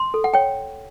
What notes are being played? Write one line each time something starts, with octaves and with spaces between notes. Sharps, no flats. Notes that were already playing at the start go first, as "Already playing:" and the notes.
Already playing: C6
A4
F#5
C#5 G5